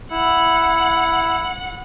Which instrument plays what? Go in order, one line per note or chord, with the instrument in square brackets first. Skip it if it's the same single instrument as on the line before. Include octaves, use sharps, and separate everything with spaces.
[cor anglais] E4 [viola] F#5